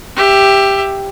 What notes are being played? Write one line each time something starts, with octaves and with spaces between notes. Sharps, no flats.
G4 E5